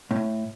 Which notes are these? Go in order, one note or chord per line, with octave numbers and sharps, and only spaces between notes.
A2